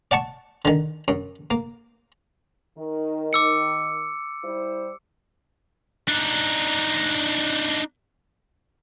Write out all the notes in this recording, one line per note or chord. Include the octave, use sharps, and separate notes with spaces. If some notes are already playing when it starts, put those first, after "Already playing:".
D5 F#5 A5 C#6
D3 D#3
F#2
A#3
D#3
D6 E6 C#7
G3 E4 C5
D4 D#4